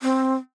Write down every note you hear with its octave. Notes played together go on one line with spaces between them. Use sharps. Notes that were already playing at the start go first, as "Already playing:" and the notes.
C4